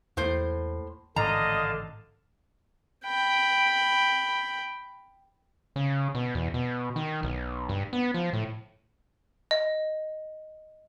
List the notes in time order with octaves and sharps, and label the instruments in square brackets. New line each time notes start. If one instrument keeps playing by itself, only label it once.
[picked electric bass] E2 A#3 [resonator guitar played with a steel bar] A2 C5
[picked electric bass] A1 G#2 D#3 [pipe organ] D3 F5 A5 [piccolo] D#5 [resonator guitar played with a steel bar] A#5
[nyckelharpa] G5 B5
[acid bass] C#3
B2
E2
B2
D#3
B1
G2
B3
F3
A2
[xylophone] D#5